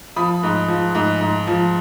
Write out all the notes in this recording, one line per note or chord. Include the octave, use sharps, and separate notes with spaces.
F3 B5 D#6
G#2
F3
G#2
G#2
F3